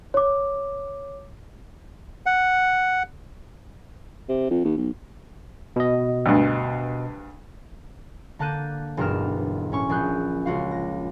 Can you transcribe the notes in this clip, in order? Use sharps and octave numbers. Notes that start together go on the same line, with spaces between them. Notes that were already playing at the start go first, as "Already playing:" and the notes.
C#5 D6
F#5
C3
F2
D#2
B1
B2 D#5
D2 G2
D3 A#3 A5 F#6 G6 D#7
E1 B1 G2 A#4 F6 E7
A2 C#4 C#6
A#1 G#4 F#6 G6
C#2 F#4 F5
A#6